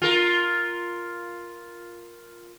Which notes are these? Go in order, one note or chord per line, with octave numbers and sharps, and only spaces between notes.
F4 A#4